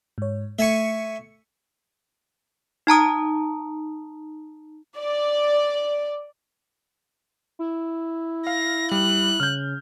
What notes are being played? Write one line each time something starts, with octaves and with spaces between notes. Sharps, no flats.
G#2 C#5
A3 E5 G#5 C#6 C#7
D#4 A5 A#5 D#6
D5
E4
F5 A#6
G3 F#6
C#3 F6 G6